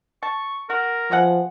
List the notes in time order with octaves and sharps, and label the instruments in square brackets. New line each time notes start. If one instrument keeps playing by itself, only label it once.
[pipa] A5 [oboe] C#6
[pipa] F#4 [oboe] A#4
[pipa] B2 G#4 F#5 [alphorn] F3